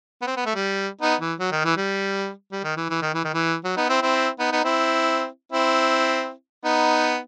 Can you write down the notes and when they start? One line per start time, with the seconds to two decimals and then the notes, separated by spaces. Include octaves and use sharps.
0.22 B3
0.27 C4
0.36 B3
0.46 A3
0.55 G3
1.01 B3 D#4
1.21 E3
1.40 F#3
1.52 D#3
1.65 E3
1.77 G3
2.52 G3
2.64 D#3
2.77 E3
2.90 E3
3.02 D#3
3.14 E3
3.24 D#3
3.34 E3
3.64 F#3
3.77 B3 D#4
3.89 C4 E4
4.02 C4 E4
4.39 B3 D#4
4.52 B3 D#4
4.64 C4 E4
5.52 C4 E4
6.64 B3 D#4